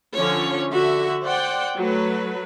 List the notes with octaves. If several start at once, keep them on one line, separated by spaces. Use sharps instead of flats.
D3 F3 C#4 C#5
D3 F#4 E5
C5 D5 F#5 G5
F#3 A3 B4